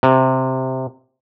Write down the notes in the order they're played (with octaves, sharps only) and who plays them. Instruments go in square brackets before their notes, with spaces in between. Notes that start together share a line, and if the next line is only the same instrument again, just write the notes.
[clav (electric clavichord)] C3